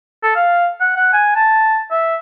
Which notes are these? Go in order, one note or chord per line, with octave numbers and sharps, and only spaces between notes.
A4
F5
F#5
F#5
G#5
A5
E5